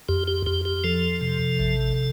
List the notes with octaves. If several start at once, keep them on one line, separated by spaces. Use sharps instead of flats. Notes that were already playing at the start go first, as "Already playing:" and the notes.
F2 G4
G4
F2 G4
G4
F3 A4
C3
A1